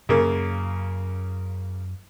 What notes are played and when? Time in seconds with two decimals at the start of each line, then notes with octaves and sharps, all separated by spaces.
0.09 F#2 C#3 A#3